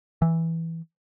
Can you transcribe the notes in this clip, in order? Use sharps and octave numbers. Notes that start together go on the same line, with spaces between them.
E3